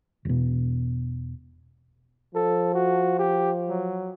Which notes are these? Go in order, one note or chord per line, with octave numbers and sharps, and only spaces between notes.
E1 B2
F3 A4
F#4
G4
F#3